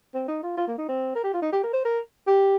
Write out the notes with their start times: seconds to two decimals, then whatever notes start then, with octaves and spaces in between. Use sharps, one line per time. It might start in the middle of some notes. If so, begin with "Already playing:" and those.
0.15 C4
0.28 D#4
0.43 F4
0.58 F4
0.68 A#3
0.78 D#4
0.89 C4
1.16 A#4
1.24 G4
1.34 F4
1.42 D#4
1.53 G4
1.64 A#4
1.74 C5
1.85 A#4
2.27 G4